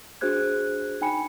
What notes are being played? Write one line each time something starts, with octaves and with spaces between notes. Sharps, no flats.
D4 F#4 G#4 C5 F#6 G#6
D#4 G5 G#5 B5 C#7